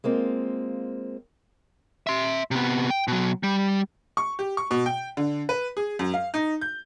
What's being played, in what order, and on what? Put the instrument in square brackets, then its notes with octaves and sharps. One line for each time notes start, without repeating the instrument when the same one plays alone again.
[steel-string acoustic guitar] G#3 A#3 C4 F4
[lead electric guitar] E5 C6
C3 B3
G5
B2 F#3
G3
[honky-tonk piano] C#6
G4
C#6
B2
G5
D3
B4
G#4
F#2
F5
D#4
G6